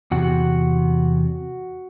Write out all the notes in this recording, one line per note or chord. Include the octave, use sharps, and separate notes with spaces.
E2 C3 F#4